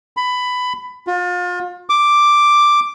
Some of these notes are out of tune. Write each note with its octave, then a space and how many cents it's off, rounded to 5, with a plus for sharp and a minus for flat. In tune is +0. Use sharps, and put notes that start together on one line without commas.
B5 +15
F4 +35
D6 +5